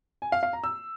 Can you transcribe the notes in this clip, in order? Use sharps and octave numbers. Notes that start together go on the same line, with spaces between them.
G#5
F5
F5
A#5
E6